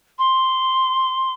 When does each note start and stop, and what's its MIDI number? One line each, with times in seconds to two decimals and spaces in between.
0.18 1.33 84